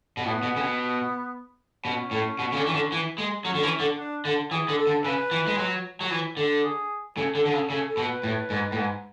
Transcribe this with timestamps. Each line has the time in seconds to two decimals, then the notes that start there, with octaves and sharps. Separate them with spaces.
0.17 B2
0.25 A2 B3
0.43 B2
0.56 C#3
0.61 B2
1.85 B2 C#4
2.11 A2
2.39 B2
2.52 C#3
2.56 D3
2.67 E3
2.74 D3
2.92 E3
3.18 G#3
3.45 F#3 C#4
3.55 D3
3.63 E3
3.80 D3
3.98 D4
4.25 D3
4.51 E3 G#4
4.69 D3
4.77 A4
4.87 D3
5.04 C#3 B4
5.31 E3
5.47 G#3
5.58 F#3
6.01 F#3
6.11 E3
6.37 D3
6.63 G#4
7.17 C#3 A4
7.35 D3 A4
7.45 D3
7.52 C#3 A4
7.70 C#3 A4
7.88 A4
7.97 B2
8.06 B4
8.23 A2
8.50 G#2
8.72 A2
8.76 G#2